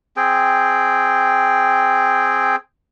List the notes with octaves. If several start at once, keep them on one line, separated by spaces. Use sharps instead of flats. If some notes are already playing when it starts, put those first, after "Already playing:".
C4 G#4 G5